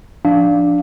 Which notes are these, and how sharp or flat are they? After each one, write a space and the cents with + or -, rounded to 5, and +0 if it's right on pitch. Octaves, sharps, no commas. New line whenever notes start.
F3 +0 D4 +0 F5 +0